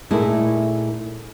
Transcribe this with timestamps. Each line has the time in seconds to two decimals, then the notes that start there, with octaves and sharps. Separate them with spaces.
0.11 A#2 A3 A#3 D#4 E4 G#4